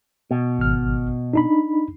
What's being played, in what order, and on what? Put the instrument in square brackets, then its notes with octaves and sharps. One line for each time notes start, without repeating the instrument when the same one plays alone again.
[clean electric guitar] B2
[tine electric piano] G#1 F6
D4 D#4 B5